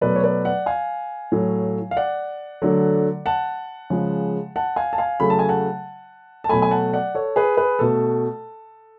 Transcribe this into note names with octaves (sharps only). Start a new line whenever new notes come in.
B2 F#3 A3 B4 D5
C#5
B4 D5
D5 F#5
F5 G#5
A2 F#3 A3
F5
D5 F#5
D3 F#3 A3
F#5 A5
C#3 F3 G#3
F#5 A5
F5 G#5
A5
F5 G#5
C#3 F#3 A3 B5
A5
G#5
F#5 A5
A5
B2 F#3 A3 G#5 B5
G#5
F#5 A5
D5 F#5
A4 C#5
G#4 B4
G#4 B4
B2 A3 A4